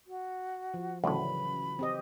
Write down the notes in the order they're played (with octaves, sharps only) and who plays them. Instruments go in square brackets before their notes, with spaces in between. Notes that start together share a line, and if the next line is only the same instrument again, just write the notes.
[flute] F#4
[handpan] F3
[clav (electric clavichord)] D2 A2 [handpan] C#3 E3 F#3 [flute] B5
[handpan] C4 G4 D#5